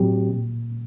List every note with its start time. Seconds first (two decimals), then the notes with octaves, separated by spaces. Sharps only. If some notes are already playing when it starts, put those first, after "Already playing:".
Already playing: A2 F#3 C4 G4
0.30 A#2